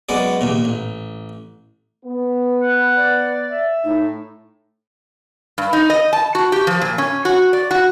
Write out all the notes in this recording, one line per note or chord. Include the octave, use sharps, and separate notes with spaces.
F#2 G#3 B3 D5
A#1 D#2 A#2
A1
B3
F#5
D5
E5
A2 D#4
G2
D#4
D#5
A5
F#4
G4
F3
A#2
C#4
F#4
D5
F#4